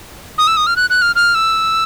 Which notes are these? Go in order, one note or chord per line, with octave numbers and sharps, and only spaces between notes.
D#6
E6
D#6
F6
F#6
F#6
F6
F6
E6